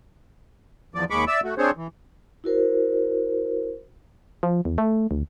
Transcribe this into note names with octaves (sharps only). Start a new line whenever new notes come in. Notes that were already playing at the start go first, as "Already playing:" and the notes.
E2 F3 D5
D#2 G#3 B5 C#6 D6
D5 E5 E6
A3 F#4
C4 D4 G#4 C5 C#5
E3
E4 F#4 A#4 C5
F3
E2
A3
D2